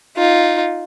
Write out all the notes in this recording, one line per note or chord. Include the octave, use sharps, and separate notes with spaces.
D#4 F4